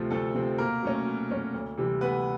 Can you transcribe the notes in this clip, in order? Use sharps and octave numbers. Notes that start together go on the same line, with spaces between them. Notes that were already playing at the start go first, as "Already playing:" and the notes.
Already playing: D2 C3 F3 A3 C4
D2 A3 A4
C3 F3 A3 C4
B2 A#3 A#4
F#3 A3 C#4
B2
F#3 A3 C#4
D2
C3 E3 G3
D2 B3 B4